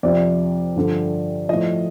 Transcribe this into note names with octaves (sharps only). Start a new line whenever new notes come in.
F2 C3 F3 D5
G2 D3 F3
A2 F3 D#5